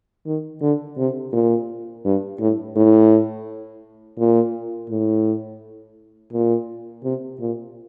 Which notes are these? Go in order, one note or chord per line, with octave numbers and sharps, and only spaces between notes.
D#3
D3
C3
A#2
G2
A2
A2
A#2
A2
A#2
C3
A#2